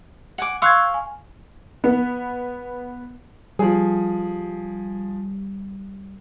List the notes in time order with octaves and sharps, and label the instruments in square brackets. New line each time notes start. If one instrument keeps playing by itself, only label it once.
[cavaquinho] F#5 G#5 D6
[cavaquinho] F5 C6 C#6 [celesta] E6 F#6 G#6
[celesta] G#5
[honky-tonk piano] B3
[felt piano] F3 G#4 [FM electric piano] G3